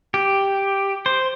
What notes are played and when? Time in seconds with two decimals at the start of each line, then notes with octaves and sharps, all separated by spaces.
0.14 G4
1.06 C5